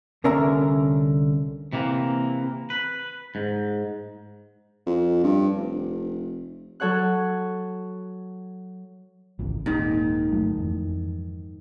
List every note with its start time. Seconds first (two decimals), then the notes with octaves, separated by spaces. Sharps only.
0.24 C2 D3 C#4 A#4 E5 A#5
1.73 C3 E3 A#3
2.70 B4
3.35 G#2
4.86 F2
5.24 G2
5.57 F1
6.80 F#3 A4 C#5 F#5 F#6
9.39 G#1 C#2 E3
9.66 D#1 G#2 D#3 A#3 C4
10.32 G1 F#3 A3
10.58 F2 E3